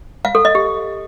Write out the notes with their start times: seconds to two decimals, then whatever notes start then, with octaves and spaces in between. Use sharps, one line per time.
0.25 F5
0.35 A4
0.45 D#5
0.55 G4